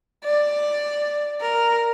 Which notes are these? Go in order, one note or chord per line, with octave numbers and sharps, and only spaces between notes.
D5
A#4